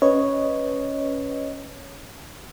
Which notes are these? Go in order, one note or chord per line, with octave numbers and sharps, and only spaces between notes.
C#4 B4 C#5 D#5